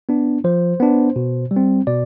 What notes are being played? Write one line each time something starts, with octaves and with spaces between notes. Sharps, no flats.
B3 D4
F3 C5
B3 D4
B2
G3
C4
B2 D5